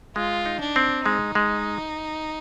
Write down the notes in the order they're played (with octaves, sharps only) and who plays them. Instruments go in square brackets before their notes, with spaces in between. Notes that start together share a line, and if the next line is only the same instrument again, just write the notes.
[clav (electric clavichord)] G#3 [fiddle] F4
[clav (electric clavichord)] D#4
[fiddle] D4
[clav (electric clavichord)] C4
[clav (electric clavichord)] G#3 [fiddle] D#4
[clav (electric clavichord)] G#3